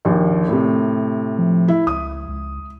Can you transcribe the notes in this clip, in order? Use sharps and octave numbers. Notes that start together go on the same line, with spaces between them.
A#1 D#2
A2 C3
F3
E4
C#2 D#6
C#2